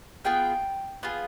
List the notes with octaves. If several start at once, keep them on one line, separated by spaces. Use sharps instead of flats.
B3 F4 G#4 G5
B3 F4 G#4